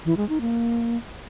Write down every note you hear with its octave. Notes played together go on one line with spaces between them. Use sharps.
E3
G#3
D#4
A#3